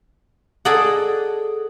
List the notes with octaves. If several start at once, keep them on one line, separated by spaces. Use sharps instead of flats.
G#4 A4 D5 D#5 F#5